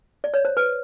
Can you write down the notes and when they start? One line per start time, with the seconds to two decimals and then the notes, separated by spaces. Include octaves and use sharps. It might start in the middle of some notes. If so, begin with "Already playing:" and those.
0.24 D5
0.34 C#5
0.45 C5
0.57 B4